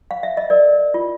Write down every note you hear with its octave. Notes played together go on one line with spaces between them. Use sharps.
F5
E5
D#5
A#4 D5
F4